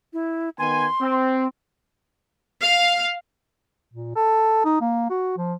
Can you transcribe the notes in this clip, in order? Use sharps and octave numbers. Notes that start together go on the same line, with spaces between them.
E4
D#3 B3 G#5 C6
C4
F5
A#2
A4
D#4
A#3
F#4
F3